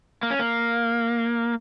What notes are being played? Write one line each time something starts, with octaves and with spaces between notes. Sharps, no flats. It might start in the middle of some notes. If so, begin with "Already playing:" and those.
A#3
C#4
A#3